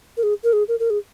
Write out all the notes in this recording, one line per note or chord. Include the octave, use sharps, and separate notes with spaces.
A#4
G#4
A#4
G#4
A#4
A#4
G#4